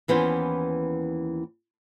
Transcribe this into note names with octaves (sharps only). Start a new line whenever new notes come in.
D#2 E3 B3 C#4 C5